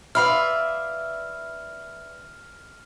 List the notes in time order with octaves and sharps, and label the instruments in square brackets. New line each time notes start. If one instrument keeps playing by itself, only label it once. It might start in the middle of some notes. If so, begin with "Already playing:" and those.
[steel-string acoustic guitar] B4 D5 E5 [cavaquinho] F5 B5 C6 [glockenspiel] F6